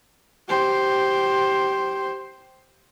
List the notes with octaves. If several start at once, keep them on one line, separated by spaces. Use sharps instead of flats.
G4 C5